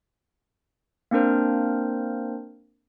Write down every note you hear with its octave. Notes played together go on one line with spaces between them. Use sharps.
A#3 C4 D4 A#4 C5